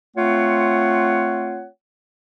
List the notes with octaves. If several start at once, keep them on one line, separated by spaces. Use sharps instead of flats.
A3 C4 F4 C#5 F#5